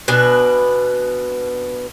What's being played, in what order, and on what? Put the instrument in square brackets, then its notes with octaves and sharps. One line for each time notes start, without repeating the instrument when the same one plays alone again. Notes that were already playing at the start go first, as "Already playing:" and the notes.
[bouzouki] B2 D4 B4 G#5